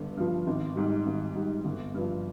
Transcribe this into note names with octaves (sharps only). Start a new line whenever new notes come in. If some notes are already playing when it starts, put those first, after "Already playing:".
Already playing: G1 G2
G2 F3
G#1
G#2 G3
G#1
G#2 G3
G1
G2 F3